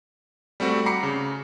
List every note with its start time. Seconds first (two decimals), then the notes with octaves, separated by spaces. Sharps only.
0.60 G3 A3 C4 F#4
0.86 A#5 B5 D6 C7 C#7
1.03 C#3